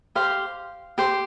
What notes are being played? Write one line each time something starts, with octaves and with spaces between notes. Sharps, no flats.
G4 C5 F5
G4 C5